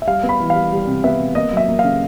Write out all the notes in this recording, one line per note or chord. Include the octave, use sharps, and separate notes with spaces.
E5
G3 F5
B3
B5
E3
F5
G3
G3
C3
B3 E5
C3
A#3 D#5
F#3 E5
A#3
C#3 F5